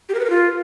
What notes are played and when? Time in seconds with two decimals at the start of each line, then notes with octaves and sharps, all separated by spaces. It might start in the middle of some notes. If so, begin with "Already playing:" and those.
0.09 G4
0.14 A#4
0.20 B4
0.25 A#4
0.30 F4